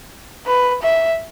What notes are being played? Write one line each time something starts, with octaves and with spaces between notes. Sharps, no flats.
B4
E5